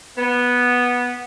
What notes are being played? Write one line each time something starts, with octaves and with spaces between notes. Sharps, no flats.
B3